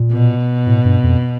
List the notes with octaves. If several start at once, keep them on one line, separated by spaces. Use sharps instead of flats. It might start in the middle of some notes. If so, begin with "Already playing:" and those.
Already playing: A#2
B2
A2
G2
F2